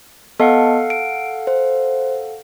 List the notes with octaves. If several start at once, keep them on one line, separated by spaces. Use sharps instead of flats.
B3 A4 D#5 F5 F#5 A5
D7
C5